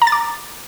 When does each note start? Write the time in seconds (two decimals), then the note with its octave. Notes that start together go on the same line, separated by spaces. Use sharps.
0.02 A#5
0.07 A6
0.12 D6